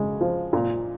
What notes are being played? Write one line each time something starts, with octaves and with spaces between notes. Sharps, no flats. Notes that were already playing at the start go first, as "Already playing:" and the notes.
Already playing: C#3 G#3
F3
A#2